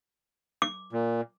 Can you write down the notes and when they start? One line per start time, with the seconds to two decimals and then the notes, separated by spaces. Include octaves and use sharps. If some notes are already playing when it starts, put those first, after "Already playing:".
0.62 D6
0.92 A#2